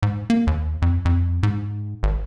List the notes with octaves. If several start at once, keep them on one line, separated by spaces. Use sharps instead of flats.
G#2
A#3
D#2
F2
F2
G#2
G#1